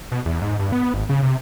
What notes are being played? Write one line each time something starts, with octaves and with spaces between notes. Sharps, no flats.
B2
E2
G#2
G2
B3
G#1
C#3
C3